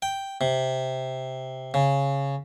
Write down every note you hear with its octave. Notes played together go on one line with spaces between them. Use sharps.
G5
C3
C#3